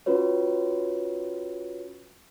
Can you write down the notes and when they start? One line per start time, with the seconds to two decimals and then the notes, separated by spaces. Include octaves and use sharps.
0.06 C#4 F4 F#4 B4 C#5